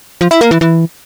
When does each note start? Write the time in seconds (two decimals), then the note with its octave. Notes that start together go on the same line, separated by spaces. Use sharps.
0.21 F3
0.31 E4
0.41 A#3
0.51 E3
0.61 E3